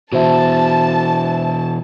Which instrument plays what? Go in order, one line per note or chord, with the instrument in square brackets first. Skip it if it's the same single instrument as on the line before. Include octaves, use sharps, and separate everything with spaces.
[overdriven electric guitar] B2 E3 [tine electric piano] F#4 C5 E5 [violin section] A5